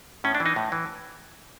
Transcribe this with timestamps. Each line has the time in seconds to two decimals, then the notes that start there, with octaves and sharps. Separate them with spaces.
0.24 A2 C#4
0.35 D4
0.40 E3
0.46 D#4
0.56 A2
0.72 E3